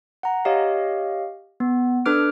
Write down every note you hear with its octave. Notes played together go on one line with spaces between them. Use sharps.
F#5 A#5
G4 C#5 D#5 F5
B3
D4 A4 B4 D6 F6 D7